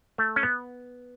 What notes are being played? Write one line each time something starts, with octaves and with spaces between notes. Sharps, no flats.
A3
C#4
B3